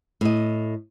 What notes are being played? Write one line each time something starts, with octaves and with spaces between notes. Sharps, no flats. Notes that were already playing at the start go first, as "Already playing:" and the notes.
A2 D#5